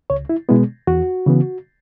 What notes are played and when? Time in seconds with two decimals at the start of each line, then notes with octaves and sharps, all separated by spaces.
0.10 C#2 C#5
0.29 E4
0.49 B2 G#3 B3 E4
0.87 E2 F#4
1.26 C#3 E3 B3